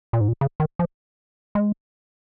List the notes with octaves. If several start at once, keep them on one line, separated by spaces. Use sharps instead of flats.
A#2
G#2
A#2
C#3
D#3
F3
G#3